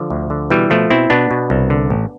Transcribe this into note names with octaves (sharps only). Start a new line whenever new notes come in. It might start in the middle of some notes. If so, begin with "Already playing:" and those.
Already playing: D3 F3
D2
D3
B2 E3 G3
B2 F3 A3
B2 C4 E4
B2 B3 D4
B2
C2
D3
A1